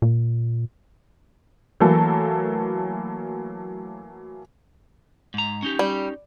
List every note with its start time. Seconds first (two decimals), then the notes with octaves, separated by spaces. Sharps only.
0.02 A#2
1.80 E3 F#3 A3 A#3 A4
5.34 G#2 A#5
5.63 C#4 D#4 G4
5.79 G3